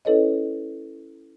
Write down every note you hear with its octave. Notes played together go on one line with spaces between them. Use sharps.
C#4 E4 A4 B4 C#5 D#5